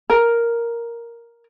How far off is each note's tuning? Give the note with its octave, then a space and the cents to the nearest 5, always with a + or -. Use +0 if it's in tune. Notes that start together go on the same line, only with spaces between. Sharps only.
A#4 +0 A#5 +0